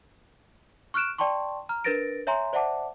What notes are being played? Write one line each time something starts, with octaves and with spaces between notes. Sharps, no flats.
C#6 F6 F#6 D7 E7
D5 G5 A5 C6 C#6
A#5 F6
D4 A#4 B4 A6 A#6 D7
C#5 E5 G#5 A#5 C6
C5 D5 E5 F#5 A5 D6